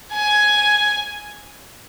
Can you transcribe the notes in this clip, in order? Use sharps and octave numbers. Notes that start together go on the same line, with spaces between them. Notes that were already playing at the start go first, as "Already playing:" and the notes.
G#5